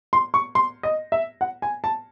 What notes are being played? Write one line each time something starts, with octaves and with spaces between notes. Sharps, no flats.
C6
C#6
C6
D#5
E5
F#5
G#5
A5